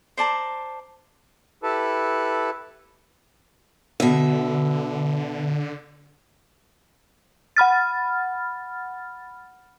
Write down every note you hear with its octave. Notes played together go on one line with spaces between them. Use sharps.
C5 D5 A5 A#5
E4 G4 A4 B4 A5
B2 D3 E5
F#5 B5 F6 A6